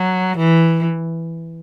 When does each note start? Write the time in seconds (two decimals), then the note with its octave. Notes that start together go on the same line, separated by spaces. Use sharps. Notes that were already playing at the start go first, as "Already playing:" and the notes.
Already playing: F#3
0.37 E3